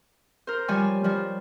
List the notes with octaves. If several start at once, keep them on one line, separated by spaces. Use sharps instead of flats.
A#4 C5
F3 G3 C#5 G#5 F6
F3 G3